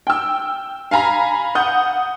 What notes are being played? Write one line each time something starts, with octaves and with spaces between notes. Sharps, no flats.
G5 E6
F5 G#5 A#5 B5
F#5 D#6 G6